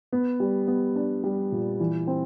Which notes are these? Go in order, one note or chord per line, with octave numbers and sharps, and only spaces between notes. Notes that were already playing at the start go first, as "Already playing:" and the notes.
B3
G3
B3
D4
G3
A#2
E3
C4